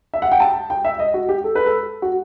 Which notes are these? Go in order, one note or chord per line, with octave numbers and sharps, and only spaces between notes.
E5
F#5
G5
A5
G5
E5
D#5
F#4
G4
A4
B4
A4
F#4